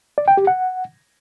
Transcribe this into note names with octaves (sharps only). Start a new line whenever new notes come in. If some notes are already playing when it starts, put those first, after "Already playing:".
D5
G5
G4
F#5